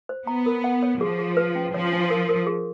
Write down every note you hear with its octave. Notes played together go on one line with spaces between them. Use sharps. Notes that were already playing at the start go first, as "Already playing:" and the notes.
C5
B3 A#5
A#4
F#5
C#5
F3 G#4
G#4
B4
C#4
F3 C#5
D4
A#4
A#4
G#4